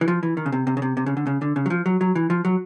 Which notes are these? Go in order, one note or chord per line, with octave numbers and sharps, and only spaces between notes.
E3
F3
E3
D#3
C#3
C3
C3
C#3
C3
C3
C#3
D3
C#3
D3
C#3
F#3
F3
F#3
F#3
E3
F3
F#3